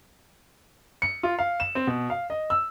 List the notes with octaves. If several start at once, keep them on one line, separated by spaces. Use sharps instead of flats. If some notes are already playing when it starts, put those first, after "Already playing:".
C#7
F4
F5
E7
C4
B2
F5
D#5
E6